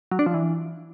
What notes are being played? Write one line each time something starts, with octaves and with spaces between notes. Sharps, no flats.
F#3
D4
F3
E3